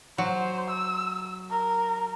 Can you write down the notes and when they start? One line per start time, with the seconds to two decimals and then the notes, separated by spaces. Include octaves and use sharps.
0.18 F#3 C5
0.70 E6
1.50 A#4